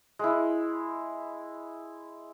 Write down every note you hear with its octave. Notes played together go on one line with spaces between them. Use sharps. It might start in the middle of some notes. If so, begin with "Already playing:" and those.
G#3 E4